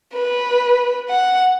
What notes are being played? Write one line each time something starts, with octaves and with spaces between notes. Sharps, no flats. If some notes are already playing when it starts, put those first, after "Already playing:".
B4
F#5